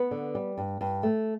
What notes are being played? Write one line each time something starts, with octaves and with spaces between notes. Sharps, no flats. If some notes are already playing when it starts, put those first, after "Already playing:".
Already playing: B3 B4
D3
G3
G2
G2
A3